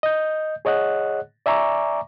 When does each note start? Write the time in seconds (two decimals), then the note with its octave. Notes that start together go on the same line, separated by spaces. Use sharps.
0.03 D#5 G6
0.65 G#4 C#5 D#5 F#5 F#6
1.46 D5 E5 G#5 A#5 C#6 D6